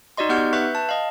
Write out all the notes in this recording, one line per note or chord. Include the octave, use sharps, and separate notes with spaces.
D#4 F#4 D5 D#5 C6
B3 D#4 G4 F#5 F6 G6
B4 E5 C#6 F#6 G6
A5
D#5 F5